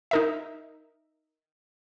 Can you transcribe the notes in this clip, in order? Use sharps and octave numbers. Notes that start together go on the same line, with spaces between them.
D#4 A#4 E5